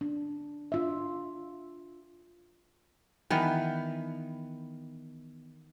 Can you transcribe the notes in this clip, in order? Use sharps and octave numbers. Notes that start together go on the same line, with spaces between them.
D4
D4 F4 E5
D#3 E3 B3